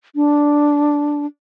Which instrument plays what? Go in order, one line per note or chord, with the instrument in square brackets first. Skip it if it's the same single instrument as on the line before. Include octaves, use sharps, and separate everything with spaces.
[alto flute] D4